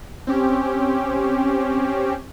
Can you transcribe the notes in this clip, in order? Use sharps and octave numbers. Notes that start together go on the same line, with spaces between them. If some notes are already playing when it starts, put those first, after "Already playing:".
C4 C#4 G4